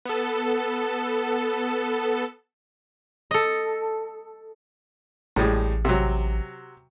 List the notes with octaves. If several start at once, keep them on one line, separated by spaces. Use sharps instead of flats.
B3 A4
A4 D#5
A1 A2 G3 G#3
C3 F#3